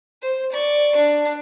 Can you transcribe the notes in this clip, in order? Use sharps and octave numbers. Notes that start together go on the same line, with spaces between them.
C5
D5 C#6
D4